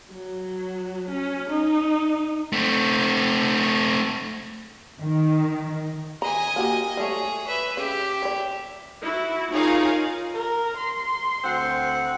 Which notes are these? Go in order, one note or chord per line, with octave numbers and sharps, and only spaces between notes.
F#3
C#4
D#4
A3 C4
D#3
D#5 G#5 A#5
A#3 F#4 G4
G3 A3 G#4 C#5
B4 E5
C#3 G4 E5
C#5 D5
E4 F#4
D#4 F4 G#4 A#4 C#5 F5
A#4
C6
D2 C4 F#5